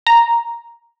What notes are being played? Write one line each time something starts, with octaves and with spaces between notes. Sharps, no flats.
A#5